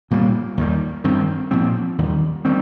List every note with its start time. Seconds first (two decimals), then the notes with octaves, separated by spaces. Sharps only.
0.11 C2 A#2 G3 A#3
0.57 D#2 D#3 G3
1.04 G2 D#3 C4
1.51 A#2 F3 C4
1.98 D#2 D#3 G3
2.45 D#3 G3 C4